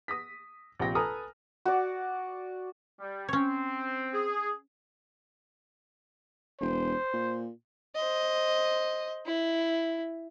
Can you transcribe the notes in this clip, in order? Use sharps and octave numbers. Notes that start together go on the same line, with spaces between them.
D#6 A#6 B6
A#1 C3 G5 A#6
A4 B4 G#5 A#5 D#6 F6
F#4 D5
G3
C4 C#4 C#5
G#4
E1 C5
A#2
C5 D#5
E4